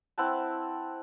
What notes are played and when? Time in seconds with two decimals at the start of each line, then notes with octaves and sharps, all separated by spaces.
0.18 C4 E4 F#5 A5